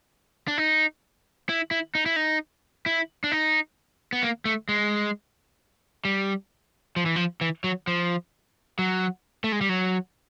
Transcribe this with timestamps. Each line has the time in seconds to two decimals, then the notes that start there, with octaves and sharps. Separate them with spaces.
0.48 D4
0.58 D#4
1.49 E4
1.71 E4
1.95 D#4
2.06 E4
2.16 D#4
2.86 E4
3.24 D4
3.31 D#4
4.13 B3
4.23 A#3
4.45 A3
4.69 G#3
6.05 G3
6.96 F3
7.06 E3
7.16 F3
7.41 E3
7.64 F#3
7.87 F3
8.79 F#3
9.44 A3
9.52 G#3
9.61 G3
9.69 F#3